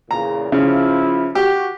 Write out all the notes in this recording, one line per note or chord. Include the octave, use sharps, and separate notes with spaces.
E2 A#2 C#3 A#5
C#3 F3 E4
F#4 G4